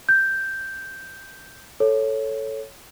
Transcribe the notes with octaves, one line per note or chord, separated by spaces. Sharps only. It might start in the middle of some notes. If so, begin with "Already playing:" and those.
G6
A4 C#5